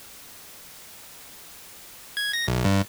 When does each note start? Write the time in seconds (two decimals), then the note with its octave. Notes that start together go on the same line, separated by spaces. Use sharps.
2.17 G#6
2.33 A#6
2.48 B1
2.65 G2